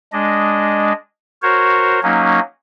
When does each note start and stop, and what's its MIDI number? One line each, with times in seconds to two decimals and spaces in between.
0.13 0.93 56
0.13 0.93 62
0.13 0.93 75
1.43 2.00 66
1.43 2.00 70
1.43 2.00 72
1.43 2.00 73
2.03 2.40 54
2.03 2.40 58
2.03 2.40 61
2.03 2.40 63